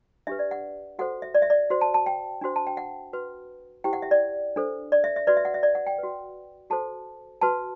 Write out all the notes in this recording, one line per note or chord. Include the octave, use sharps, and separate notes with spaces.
D4 G4 B4 E5
D5
F#5
F#4 A4 C5 F#5
E5
D5
E5
D5
F#4 C5
A5
A5
G5
D4 F#4 C5
A5
G5
F#5
F#4 B4
E4 G4 C5 G5
F#5
E5
D5
D4 A4 C5
D5
E5
E5
F#4 B4 D5
E5
F#5
E5
D5
F#5
G5
F#4 B4
F#4 A4 C5 A5
F#4 B4 A5